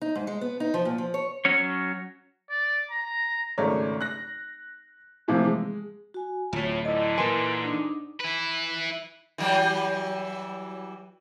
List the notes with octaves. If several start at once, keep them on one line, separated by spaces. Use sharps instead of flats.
D#4
G#2
G#3
B3
D#4
F3
A#2
F3
C#5
F#3 C#4 C#5
D5
A#5
G#1 C#3 A3 A#4 C#5 D5
F#6 A#6
A2 C3 E3 F3 A#3
G#3
F#4 G#5
D1 A2 F4 C#5
G#2 D3 E4 D#5 A5
A#2 E3 A#4 B4 G#5 C6
D4 D#4
E4 B4
E3 F#3 G3